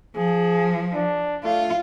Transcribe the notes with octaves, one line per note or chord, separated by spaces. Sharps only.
F3 G#4
D4
A3 F4